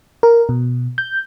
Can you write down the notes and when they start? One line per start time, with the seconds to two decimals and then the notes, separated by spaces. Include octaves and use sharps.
0.23 A#4
0.49 B2
0.98 G6